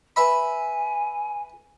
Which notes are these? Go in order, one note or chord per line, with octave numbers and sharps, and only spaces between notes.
B4 E5 G#5 B5